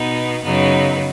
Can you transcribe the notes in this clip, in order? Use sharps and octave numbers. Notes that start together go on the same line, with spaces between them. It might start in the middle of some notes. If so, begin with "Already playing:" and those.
Already playing: B2 B3 D#4
F#2 C#3 F#3 B3 D#4